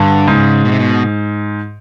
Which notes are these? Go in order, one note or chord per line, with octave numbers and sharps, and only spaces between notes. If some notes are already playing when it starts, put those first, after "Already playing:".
Already playing: G2 D3
G#2 C#3
B2
C3
B2